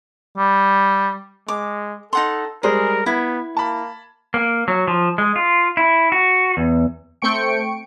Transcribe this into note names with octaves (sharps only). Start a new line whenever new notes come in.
G3
G#3 D6
D#4 A4 F#5 C6
G3 G#3 G#4 A#4 C5
B3 E4 G#6
A#3 A5 B5
A#3
F#3
F3
G#3
F4
E4
F#4
E2
A3 C4 G5 C#6 C#7 D7